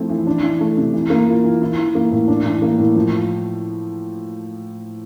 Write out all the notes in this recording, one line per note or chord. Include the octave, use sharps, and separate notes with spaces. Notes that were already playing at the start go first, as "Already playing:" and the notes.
Already playing: F3 A3 C4 E4
E3
D4
E3
A3
C3
E3
A#3
F4
E3
E4
E3
A#3
A2
D4
E3
A#3
A2
F3